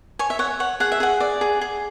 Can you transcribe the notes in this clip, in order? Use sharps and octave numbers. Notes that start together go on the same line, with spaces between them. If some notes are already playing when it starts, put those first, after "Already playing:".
C#5 G#5
E5
C#5 F#5
C#5 F#5
G#4 F#5
E5
G#4 F#5
D5
G#4
G#4